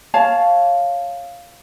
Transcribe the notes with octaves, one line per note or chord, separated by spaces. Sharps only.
C#5 F5 A5